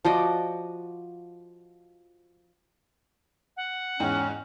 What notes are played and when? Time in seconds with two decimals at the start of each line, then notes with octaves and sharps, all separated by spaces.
0.05 F3 F#4 D5 D#5
3.57 F#5
4.00 E2 G#2 C#4 G5